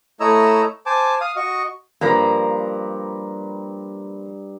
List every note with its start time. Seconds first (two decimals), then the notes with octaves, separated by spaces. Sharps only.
0.20 A3 E4 C#5 D#5 A#5 E6
0.86 C5 G#5 A5 D6
1.21 F5 D#6
1.36 F#4 D#5 C#6
2.01 G2 F3 A#3 A#5 B5